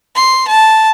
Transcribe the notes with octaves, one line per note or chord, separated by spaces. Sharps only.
C6
A5